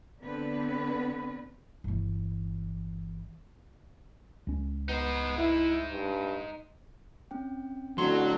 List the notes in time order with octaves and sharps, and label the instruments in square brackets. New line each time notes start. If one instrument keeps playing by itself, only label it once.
[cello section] D3 B3 C4 B4
[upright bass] G1 E3
[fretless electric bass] C#2 C#4
[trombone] B3 [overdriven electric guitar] D#4 C5
[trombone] E4
G2
[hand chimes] C4 C#4 G5
[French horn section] F2 A2 D3 [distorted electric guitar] F#3 [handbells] C6